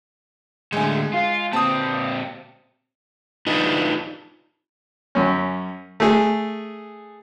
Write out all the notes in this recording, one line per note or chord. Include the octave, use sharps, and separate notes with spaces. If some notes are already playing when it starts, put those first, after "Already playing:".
A2 D3 G#3 G#5
F4
A#2 C4 A5 D#6
D4 D#4 F4 B4 D#5
F#2 C#4
A3 G#4